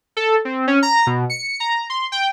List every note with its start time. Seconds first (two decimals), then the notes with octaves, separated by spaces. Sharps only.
0.17 A4
0.45 C4
0.67 C#4
0.83 A#5
1.07 B2
1.30 C#7
1.60 A#5
1.90 C6
2.12 G5